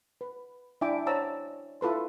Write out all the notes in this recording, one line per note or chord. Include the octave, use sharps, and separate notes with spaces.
B4
D4 E4 E5 G5 G#5 D6
C5 C#5 F#5 A5 A#5 E6
E4 F4 A4 B4 C6